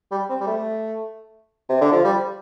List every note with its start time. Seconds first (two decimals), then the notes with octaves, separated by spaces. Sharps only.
0.11 G3
0.30 C4
0.41 G3
0.47 A3
1.69 C3
1.81 D3
1.92 F3
2.04 G3